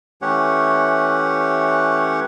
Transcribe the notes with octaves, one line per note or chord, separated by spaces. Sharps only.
E3 A3 C#4 G4 C#5 F#5